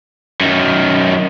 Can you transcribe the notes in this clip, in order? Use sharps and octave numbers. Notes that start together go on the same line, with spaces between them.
F#2 D#3